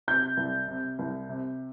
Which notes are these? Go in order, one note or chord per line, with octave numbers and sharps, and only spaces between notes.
C3 G6
C2
C3
C2
C3